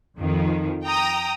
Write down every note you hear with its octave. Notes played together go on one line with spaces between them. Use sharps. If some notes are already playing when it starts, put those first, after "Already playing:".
F2 D#3 F3
G5 A#5 D#6